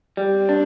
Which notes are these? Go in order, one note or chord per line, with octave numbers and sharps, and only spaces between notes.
G3 C4
D4